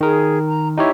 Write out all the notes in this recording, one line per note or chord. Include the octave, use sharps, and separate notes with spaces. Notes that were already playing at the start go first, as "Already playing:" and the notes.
D#3 G#4 A#4
A#5
D#4 E4 G4 C#5